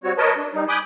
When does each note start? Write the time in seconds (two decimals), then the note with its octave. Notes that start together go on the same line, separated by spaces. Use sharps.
0.04 G3 C4 F#4 C#5
0.18 A#4 B4 C#5 D#5 A5
0.37 D4
0.54 G3 D#4
0.69 G#5 B5 D6 D#6 F#6 G6